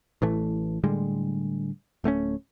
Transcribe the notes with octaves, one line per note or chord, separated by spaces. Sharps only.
A1 A2 E3 A3
A2 D3 G3 G#3
D1 A3 B3 C#4